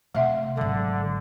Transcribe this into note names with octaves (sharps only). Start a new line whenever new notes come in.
C3 A3 E5 F#5
G#1 D3 F#3